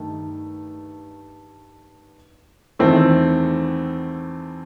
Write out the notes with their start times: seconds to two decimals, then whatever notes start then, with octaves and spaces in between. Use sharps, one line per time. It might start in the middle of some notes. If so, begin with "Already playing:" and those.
Already playing: G2 D#3 A3
2.79 E2 D#3 A3 C4 E4